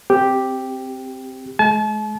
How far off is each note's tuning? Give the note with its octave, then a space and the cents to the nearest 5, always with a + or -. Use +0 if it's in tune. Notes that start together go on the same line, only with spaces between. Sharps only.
C4 +0 G4 +0
G#3 +35 A5 -40